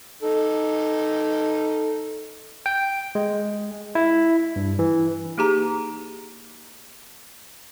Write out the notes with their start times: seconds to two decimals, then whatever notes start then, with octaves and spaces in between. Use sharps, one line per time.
0.23 D#4 A4
2.66 G5
3.15 G#3
3.95 E4
4.56 G2
4.79 E3
5.38 A#3 D#4 G4 G#4 A#5